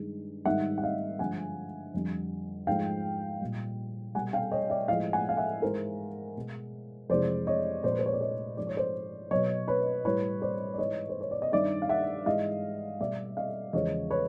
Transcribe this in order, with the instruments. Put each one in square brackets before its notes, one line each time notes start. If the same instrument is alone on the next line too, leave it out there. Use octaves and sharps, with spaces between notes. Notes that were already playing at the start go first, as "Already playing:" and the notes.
Already playing: [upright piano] G2 D#3 G#3
G#2 D#3 G3 E5 F#5
F#5
D#5 F5
G2 D3 F3 G#3 F#5 G#5
F2 D3 G3
G#2 F3 G#3 F5 G5
A#2 G3
B2 G3 F#5 G#5
F5 G5
C#5 D#5
D5 E5
A2 F3 G#3 D#5 F5
F#5 G#5
F5
E5 F#5
G#2 E3 G#3 A#4 C5
B2 G#3
F2 C3 E3 G#3 C5 D5
C#5 D#5
A#2 F3 G#3 C5 D5
B4
C5
C#5
D5
C#5 D#5
G#2 F3 G#3 D5
C#5
C5 D5
B2 F#3 C#5 D#5
B4 C#5
A2 E3 G3 B4 C#5
C5 D5
D5
G#2 E3 G#3 C#5 D#5
C5
C#5
D5
D#5
G2 D#3 G3 D5 E5
F5
E5 F#5
G#2 E3 G#3 D#5 F5
B2 G3 D5 E5
D#5 F5
E2 C#3 F3 G#3 C#5 D#5
B4 C#5